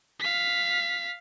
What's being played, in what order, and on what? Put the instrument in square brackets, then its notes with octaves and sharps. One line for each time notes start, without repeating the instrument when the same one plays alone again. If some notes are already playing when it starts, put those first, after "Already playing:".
[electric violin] F5 B6